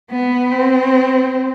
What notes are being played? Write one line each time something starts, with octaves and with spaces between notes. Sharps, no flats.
B3
C4